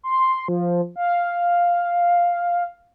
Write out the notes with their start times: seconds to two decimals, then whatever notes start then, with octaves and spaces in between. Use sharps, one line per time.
0.03 C6
0.48 F3
0.96 F5